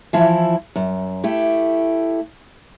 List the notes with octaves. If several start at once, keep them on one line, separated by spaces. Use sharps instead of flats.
E3 F3 E4
F#2
A3 E4 G4